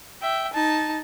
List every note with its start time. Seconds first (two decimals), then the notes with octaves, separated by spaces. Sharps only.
0.22 E5 G5
0.53 D#4 A5